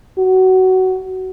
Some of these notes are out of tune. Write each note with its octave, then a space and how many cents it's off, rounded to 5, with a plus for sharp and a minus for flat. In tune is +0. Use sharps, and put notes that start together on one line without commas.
F#4 +20